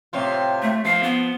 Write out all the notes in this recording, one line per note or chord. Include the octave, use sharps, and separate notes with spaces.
A2 C3 F4
A3
F3 F5
B3